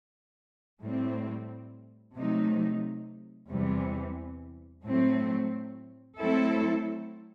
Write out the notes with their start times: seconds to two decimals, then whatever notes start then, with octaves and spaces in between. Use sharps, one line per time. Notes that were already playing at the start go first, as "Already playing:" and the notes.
0.82 A2 G3 C4
2.15 C3 F#3 A3 D#4
3.50 E2 C3 E3 G3
4.84 A2 F#3 A3 C4
6.18 F#3 A3 C4 E4 A4